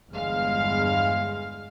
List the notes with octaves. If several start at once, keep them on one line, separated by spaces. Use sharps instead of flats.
G1 E2 G#3 F5 F6